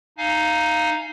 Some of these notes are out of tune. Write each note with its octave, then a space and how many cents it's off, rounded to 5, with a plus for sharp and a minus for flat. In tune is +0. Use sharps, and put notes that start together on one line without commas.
D#4 +0 F5 -5 G#5 +25